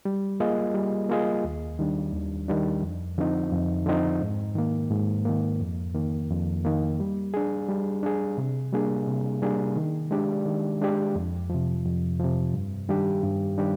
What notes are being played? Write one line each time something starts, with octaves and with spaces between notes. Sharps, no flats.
G3
A#3 F4 G#4 D#5
G3
A#3 F4 G#4 D#5
D#2
D#3 G3 D4
D#2
D#3 G3 D4
F2
D3 F3 C4 D#4
F2
D3 F3 C4 D#4
G#2
D#3 A#3
G#2
D#3 A#3
F2
D#3 A#3
F2
D#3 A#3
G3
D4 G#4
G3
D4 G#4
C3
G3 A#3 D4 G#4
C3
G3 A#3 D4 G#4
D#3
G#3 D4 G4 D5
D#3
G#3 D4 G4 D5
F2
C3 F3
F2
C3 F3
G2
D#3 G3 D4 G4
G2
D#3 G3 D4 G4